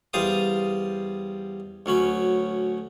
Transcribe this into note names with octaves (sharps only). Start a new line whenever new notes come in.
E2 G3 C5 F5 A5 D#6
D2 F#3 C#4 B5